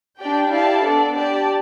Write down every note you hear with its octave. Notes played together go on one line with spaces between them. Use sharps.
D4 G4 D5 G5
E4 G4 D5 F5 A5
B3 D4 A4 D5
G4 D5 A5